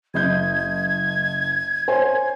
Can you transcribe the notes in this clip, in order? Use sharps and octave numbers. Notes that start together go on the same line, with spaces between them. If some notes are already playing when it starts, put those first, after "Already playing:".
F#1 D#5 G6 G#6
C5 C#5 G#5